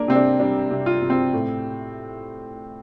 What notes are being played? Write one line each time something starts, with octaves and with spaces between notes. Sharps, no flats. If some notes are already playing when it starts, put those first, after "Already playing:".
Already playing: A#3 D4 A#4
C3 C4
D4
G3 D4
C3
F4
C3
C4
A2